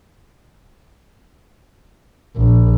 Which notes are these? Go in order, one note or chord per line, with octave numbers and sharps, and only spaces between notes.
A#1